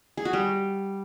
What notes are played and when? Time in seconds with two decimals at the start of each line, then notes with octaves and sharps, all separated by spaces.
0.17 G#4
0.25 F#4
0.33 G3